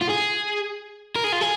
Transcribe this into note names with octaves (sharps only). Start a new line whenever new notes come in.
F4
G#4
A#4
G#4
F4
G#4